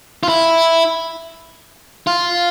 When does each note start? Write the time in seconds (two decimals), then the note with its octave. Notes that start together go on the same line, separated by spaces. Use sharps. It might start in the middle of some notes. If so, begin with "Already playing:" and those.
0.23 F4
0.29 E4
2.07 F4